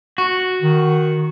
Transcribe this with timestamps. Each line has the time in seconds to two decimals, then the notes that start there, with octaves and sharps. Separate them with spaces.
0.18 F#4
0.62 D#3